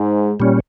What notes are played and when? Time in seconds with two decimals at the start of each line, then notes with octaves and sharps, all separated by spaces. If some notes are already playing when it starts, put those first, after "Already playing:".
Already playing: G#2
0.40 A#2 G3 C#4